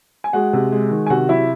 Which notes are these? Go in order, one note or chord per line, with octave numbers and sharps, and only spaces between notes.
G#5
G#3 F#4 F#5
C3
G#3
D#3
G#5
C3 F#4 F#5
F#3 E4 E5